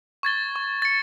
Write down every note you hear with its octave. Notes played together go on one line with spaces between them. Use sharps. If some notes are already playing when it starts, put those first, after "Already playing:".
C#6 G#6 A6 G7
C#6
A6 C#7